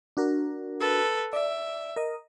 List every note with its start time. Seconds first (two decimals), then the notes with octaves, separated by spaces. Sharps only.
0.17 D4 F#4 A#4
0.80 A4 B4
1.33 D5 E5
1.96 A#4 D#5